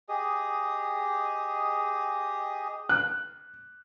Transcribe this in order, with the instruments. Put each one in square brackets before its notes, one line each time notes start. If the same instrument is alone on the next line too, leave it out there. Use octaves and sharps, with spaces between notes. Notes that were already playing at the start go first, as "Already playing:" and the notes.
[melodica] G4 G#4 D#5 D#6
[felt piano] F#6